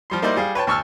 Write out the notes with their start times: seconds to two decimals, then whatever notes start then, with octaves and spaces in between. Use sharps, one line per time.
0.10 F3 G3 C6
0.22 G3 A#3 D#4 E4 C5 D5
0.36 G3 G#4 F5
0.55 B4 C#5 G5 A5
0.67 D2 A5 C#6 E6 F6